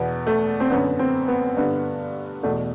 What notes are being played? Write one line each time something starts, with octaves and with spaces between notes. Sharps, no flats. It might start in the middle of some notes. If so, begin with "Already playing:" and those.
Already playing: E2 B2 B3
A3
C4
F#2 D3 B3
C4
B3
G2 D3 B3
E2 B2 A3